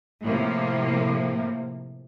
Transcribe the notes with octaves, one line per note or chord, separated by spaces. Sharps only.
A2 C3 F3 A#3